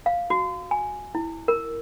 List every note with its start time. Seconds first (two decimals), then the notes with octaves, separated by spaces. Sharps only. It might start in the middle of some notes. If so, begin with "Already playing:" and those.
0.06 F5
0.30 F#4
0.71 G#5
1.15 E4
1.48 A#4